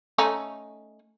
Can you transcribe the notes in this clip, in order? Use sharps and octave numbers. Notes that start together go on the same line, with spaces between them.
A3 C#4 D#4